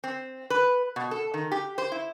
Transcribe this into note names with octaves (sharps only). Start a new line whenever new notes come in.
C4
B4
B2
A4
D#3
G4
C5
E4